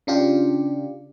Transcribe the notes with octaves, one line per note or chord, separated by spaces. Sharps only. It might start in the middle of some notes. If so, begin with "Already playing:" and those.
C#3 D4 F4 G4